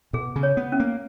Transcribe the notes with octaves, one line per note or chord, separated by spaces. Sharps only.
B2 G#4
C#3
C#5
B3
C#4
A#3